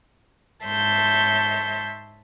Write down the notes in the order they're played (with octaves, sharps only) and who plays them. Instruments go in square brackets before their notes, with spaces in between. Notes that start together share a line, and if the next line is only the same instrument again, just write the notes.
[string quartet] G#2 C#5 E5 A5 C6 G6